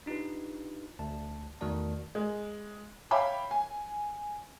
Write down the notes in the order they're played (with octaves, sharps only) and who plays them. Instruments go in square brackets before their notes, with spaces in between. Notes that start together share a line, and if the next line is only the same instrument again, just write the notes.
[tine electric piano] D4 D#4 F4 G4 B4
D2 A5
E2 D#3 A3 F#4 D5 A5
[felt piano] G#3
C#5 E5 F5 G5 B5 D6
G#5